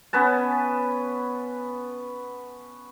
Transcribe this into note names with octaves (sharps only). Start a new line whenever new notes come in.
B3 C#4 B4 A5